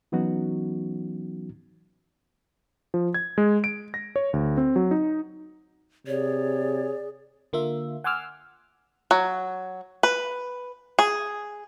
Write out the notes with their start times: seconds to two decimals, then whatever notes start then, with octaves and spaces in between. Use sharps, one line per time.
0.12 E3 F#3 B3 C#4 D#4 F#4
2.94 F3
3.14 G#6
3.38 G#3
3.64 D7
3.94 A#6
4.16 C#5
4.33 D2
4.57 C4
4.76 F#3
4.91 D#4
6.07 C3 G#4 C#5 D5
7.53 D3 A#3 F4 E5
8.04 F#5 G#5 C6 D6 E6 F6
9.11 F#3
10.03 B4
10.99 G#4